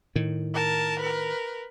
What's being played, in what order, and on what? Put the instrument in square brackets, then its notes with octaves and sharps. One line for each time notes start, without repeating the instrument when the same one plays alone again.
[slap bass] A2 D#3
[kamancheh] A#4 A5
A#4 B4